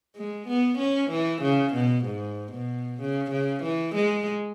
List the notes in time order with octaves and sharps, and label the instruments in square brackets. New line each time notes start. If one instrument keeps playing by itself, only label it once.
[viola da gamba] G#3
B3
C#4
E3
C#3
B2
G#2
B2
C#3
C#3
E3
G#3